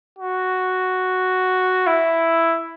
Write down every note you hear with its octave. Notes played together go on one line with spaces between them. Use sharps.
F#4
E4